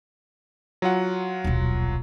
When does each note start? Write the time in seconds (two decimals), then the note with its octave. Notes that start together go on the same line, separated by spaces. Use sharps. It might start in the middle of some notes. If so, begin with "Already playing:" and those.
0.82 F#3 F4 F#5
1.44 D#1 B1